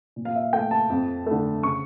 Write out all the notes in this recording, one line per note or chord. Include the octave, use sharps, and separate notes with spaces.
A#2
F5
E5
A3 G5
A5
F2
D3 A3
C#3 C#6